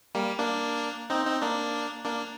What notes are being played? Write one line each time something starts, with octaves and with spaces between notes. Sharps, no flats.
G3 A#3
A#3 D4
C4 D#4
C4 D#4
A#3 D4
A#3 D4